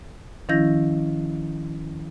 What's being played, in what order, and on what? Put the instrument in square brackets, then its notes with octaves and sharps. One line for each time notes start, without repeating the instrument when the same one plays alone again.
[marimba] D#3 F3 C#4 E4 G6 A#6